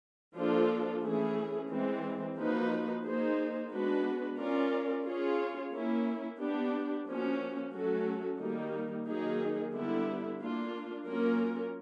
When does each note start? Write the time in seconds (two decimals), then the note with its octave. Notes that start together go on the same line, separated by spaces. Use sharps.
0.36 F3 A#3 D4 F4 A4
1.03 E3 A3 C#4 E4 G#4
1.71 E3 G#3 C4
2.37 F3 A#3 D#4 F#4 B4
3.04 A#3 D#4 G#4 C5
3.71 G#3 B3 D4 F#4 B4
4.38 C#4 F4 A#4 D5
5.05 C#4 F4 G#4 C#5
5.72 A#3 C#4 E4
6.39 B3 D4 G4
7.06 F3 A#3 C#4 F#4
7.73 F#3 A3 C#4 F#4 A4
8.39 D#3 G3 A#3 D#4
9.06 D#3 F#3 A#3 D#4 G#4
9.74 D3 G3 B3 E4
10.41 A#3 D4 F4
11.07 F#3 A#3 C#4 F4 A#4